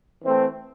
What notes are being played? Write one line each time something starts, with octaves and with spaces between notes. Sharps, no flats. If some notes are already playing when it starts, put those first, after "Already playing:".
E3 A3 C4